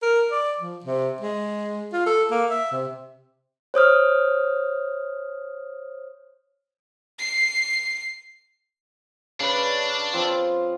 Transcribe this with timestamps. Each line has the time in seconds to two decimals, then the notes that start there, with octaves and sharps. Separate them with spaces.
0.02 A#4
0.31 D5
0.59 F3
0.84 C3
1.21 G#3
1.93 F4
2.06 A4
2.31 A#3
2.50 E5
2.72 C3
3.74 C5 C#5 D#6 F6
7.19 C7
9.40 C#3 D4 B4
10.13 F3 C4